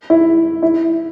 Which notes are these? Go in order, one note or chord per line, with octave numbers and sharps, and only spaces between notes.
E4
E4